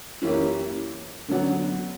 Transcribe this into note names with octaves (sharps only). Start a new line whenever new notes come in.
F#2 E3 A#3 C#4 G4
D3 F#3 B3 F#4